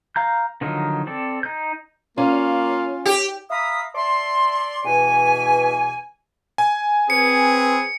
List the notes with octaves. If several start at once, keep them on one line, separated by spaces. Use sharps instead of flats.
F5 A#5 G6
D3 D#3 F3 F#3 D#4
C4 A4 D5
D#4 G6
A#3 C#4 F4
G4
E5 F5 A#5 B5 D#6
D5 E5 A5 C6
E2 B2 E3 B4 G#5
G#5
C4 G#4 B4 C#7